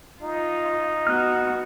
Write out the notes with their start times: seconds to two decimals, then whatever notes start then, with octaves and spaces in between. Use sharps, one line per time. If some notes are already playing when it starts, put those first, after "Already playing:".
0.21 D#4 F4
1.07 B3 F#4 F6 F#6